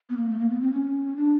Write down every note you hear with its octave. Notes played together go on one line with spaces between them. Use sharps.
B3
A#3
A3
A#3
B3
C4
C#4
D4